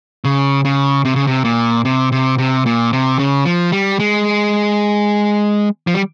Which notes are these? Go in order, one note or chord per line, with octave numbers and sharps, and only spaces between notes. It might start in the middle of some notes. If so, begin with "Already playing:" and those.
C#3
C#3
C3
C#3
C3
A#2
C3
C3
C3
A#2
C3
C#3
F3
G3
G#3
F3
G3